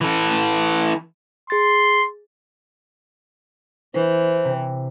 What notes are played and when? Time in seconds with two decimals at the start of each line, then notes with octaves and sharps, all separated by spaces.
0.01 E3 A4
1.50 G#4 C6 A6
3.94 E3 C5
4.45 C3